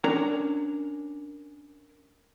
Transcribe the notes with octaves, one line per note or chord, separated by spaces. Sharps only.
C#4 D4 A#4 A#5